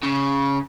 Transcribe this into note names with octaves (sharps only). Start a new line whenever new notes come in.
C#3